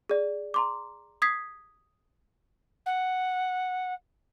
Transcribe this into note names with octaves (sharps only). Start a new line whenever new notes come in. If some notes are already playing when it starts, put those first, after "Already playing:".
G#4 D5
A#5 C6 D6
D#6 G#6 B6 C7
F#5